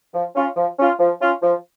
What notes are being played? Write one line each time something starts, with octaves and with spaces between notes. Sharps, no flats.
F3
C#4 F4
F3
C#4 F4
F3
C#4 F4
F3